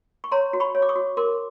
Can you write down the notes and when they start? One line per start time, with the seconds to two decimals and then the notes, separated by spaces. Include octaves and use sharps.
0.24 C#6
0.32 C#5 A#5 C6
0.53 F#4
0.60 B5 C#6
0.75 C#5
0.82 D6
0.89 C#6 D#6
0.96 F#4
1.17 A#4 C6 D6